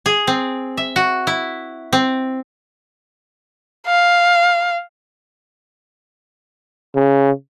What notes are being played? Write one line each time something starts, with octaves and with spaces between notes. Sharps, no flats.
G#4
C4
E5
F#4
E4
C4
F5
C#3